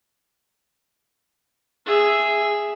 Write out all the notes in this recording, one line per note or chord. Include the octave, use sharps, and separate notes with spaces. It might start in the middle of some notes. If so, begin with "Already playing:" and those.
G#4 E5